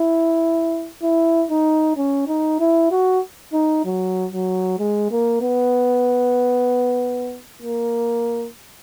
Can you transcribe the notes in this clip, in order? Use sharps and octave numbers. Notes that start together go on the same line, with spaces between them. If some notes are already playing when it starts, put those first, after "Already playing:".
Already playing: E4
E4
D#4
C#4
D#4
E4
F#4
D#4
F#3
F#3
G#3
A#3
B3
A#3